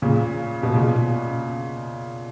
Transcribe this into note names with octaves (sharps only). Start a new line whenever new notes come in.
A#2 C#3
B2
A#2 C#3